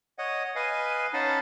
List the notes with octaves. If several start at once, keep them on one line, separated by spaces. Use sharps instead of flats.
C#5 D#5 F#5
B4 D#5 F5 G#5
C#4 D#4 F5 F#5 A5 B5